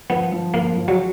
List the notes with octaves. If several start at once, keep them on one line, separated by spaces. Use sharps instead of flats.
F3 B3
F3
F3 A#3
F3
F#3